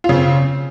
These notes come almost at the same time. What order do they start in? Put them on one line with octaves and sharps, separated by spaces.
F4 C#3 C4